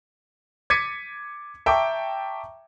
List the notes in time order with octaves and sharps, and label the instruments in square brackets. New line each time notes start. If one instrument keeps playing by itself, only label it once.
[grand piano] D6 G#6 A6 B6 C#7 D#7
E5 G5 A5 A#5 C#6 D6